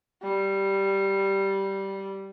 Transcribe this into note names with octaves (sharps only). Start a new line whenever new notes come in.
G3